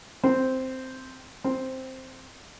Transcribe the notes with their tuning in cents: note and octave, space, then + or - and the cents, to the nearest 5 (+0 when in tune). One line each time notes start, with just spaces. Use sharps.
C4 -5
C4 +0